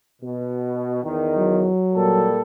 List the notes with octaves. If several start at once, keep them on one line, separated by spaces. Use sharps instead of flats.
B2
E2 D#3
F#3
A#2 G3 A4